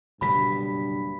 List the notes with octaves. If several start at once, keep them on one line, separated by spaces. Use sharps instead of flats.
F#1 G2 B2 D3 B5 B6